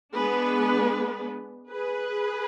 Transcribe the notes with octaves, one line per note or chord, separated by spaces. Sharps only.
G#3 B3 D4 G#4 B4
G#4 B4